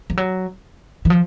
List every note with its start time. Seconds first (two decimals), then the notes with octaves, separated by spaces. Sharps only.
0.10 F3
0.17 F#3
1.05 E3
1.10 F3